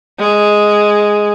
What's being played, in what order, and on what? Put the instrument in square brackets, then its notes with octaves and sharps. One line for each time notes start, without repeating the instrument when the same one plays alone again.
[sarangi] G#3